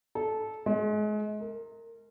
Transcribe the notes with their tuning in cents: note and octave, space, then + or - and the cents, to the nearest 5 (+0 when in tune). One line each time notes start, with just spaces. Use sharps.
A4 -15
G#3 +35
A#4 -25